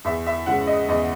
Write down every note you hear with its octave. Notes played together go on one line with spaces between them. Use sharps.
E2 E5
E5
C#3 G#3 F#5
D#5
E2 D#5